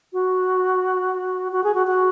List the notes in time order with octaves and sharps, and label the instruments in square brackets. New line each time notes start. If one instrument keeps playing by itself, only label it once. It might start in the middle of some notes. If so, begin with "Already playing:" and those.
[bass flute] F#4
F#4
G#4
F#4
F#4